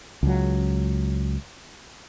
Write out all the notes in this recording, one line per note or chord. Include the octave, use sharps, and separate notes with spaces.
C#2 F#3